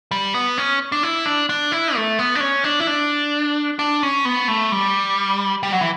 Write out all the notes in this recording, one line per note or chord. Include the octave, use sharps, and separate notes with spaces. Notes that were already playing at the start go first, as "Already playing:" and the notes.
G3
B3
C#4
D4
E4
D4
D4
E4
A3
B3
D4
C#4
D4
E4
D4
D4
C#4
B3
A3
G3
G3
F#3
E3